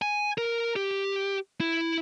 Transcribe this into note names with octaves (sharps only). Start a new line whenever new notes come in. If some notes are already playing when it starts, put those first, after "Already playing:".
G#5
A#4
G4
E4